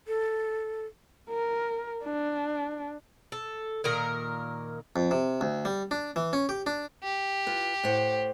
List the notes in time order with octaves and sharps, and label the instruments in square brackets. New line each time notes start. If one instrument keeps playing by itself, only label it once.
[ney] A4
[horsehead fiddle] A#4
D4
[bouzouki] A4
A#2 D#3 A#4
[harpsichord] F2
C3
D2
G3
D4
E3
C#4
G4
D4
[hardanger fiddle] G4
[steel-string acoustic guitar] F4 B4
A2 C5 F#5